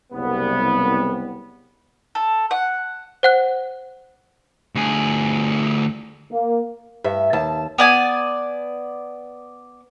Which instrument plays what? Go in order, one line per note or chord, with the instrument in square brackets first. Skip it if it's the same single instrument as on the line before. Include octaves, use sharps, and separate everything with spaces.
[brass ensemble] F#1 C2 G3 B3
[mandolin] A4
F#5
[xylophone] C5 F#5 F#6
[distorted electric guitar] D2 G#4
[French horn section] A#3
[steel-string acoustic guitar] G2 E5
D#2 A5
[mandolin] B3 D5 G#5